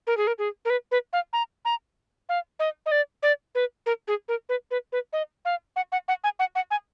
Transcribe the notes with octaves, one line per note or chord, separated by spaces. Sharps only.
A#4
G#4
A#4
G#4
A#4
B4
B4
F5
A#5
A#5
F5
D#5
D#5
D5
D5
B4
A#4
G#4
A#4
B4
B4
B4
D#5
F5
F#5
F#5
F#5
G#5
F#5
F#5
G#5